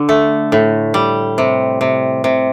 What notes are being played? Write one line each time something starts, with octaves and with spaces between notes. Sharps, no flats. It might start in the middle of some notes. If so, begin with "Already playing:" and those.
Already playing: D3
A3
A2
G3
C3
C3
C3